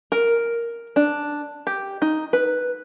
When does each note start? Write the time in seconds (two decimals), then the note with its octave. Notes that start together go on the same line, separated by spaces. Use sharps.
0.12 A#4
0.96 D4
1.67 G4
2.02 D#4
2.33 B4